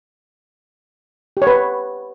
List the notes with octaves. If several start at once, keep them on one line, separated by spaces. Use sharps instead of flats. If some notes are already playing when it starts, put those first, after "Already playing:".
G4
C#5
B4